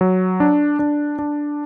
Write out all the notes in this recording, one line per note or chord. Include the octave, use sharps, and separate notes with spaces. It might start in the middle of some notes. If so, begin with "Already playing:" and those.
F#3
D4
D4
D4